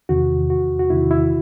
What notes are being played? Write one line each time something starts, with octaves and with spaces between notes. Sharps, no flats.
E2 C3 D#3 F#4
F#4
F#4
E2 C3 D#3 E4
E4